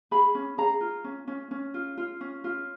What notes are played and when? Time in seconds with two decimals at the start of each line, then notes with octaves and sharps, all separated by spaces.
0.11 G#4 B5
0.35 C#4
0.58 G#4 A#5
0.81 F4
1.04 C#4
1.28 C#4
1.51 C#4
1.74 F4
1.98 F4
2.21 C#4
2.44 F4